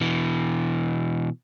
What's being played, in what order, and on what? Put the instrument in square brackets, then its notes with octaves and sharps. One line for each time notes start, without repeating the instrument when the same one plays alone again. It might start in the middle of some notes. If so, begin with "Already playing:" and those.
[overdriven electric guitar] B2 E3